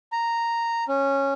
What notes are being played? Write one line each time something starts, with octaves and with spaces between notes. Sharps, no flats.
A#5
C#4